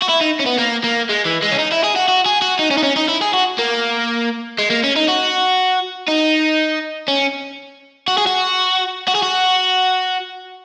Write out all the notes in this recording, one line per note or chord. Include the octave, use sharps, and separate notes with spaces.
F#4
E4
D#4
C#4
B3
A#3
A#3
G#3
E3
G#3
C#4
D#4
E4
G#4
F#4
F#4
G#4
F#4
D#4
C#4
D#4
C#4
D#4
E4
G#4
F#4
A#3
G#3
A#3
C#4
D#4
F#4
D#4
C#4
F#4
G#4
F#4
F#4
G#4
F#4